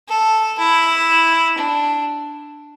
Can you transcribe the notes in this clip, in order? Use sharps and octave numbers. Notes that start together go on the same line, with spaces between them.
A4
E4
D4